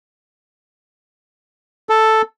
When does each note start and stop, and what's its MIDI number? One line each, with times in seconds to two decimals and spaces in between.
1.89 2.22 69